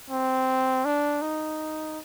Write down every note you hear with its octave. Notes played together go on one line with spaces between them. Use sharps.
C4
D4
D#4